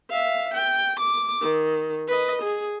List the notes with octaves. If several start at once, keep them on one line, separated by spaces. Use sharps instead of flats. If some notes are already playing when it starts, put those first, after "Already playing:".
E5 F5
G5
D6
D#3
B4 D#5
G#4